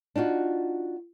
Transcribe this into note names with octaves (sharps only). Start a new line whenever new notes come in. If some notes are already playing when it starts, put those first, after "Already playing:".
D4 D#4 F4 F#4